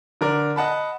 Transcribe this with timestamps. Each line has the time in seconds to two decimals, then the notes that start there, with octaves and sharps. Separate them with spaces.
0.21 D3 A#4 D5
0.56 D#5 F#5 A5 B5